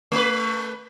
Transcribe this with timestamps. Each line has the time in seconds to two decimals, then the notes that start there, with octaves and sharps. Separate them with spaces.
0.12 A3 B4